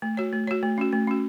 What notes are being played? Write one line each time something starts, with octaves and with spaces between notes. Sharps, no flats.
A3
F#4 C#5
A3
F#4 C#5
A3
C#4 F#4
A3
C#4 F#4